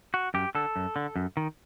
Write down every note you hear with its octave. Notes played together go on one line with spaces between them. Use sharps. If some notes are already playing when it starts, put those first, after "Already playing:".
F#4
F#2 G4
D3 A4
F#2
D3
F#2
D#3